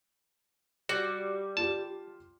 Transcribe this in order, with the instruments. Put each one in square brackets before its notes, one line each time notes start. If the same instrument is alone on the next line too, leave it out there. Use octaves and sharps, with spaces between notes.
[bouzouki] G3 [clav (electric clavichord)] F#4
[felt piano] F4 G4 [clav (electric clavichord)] A5